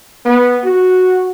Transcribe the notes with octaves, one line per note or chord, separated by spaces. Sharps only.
B3
F#4